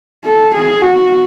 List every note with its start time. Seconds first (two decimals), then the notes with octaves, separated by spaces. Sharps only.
0.25 A4
0.54 G#4
0.82 F#4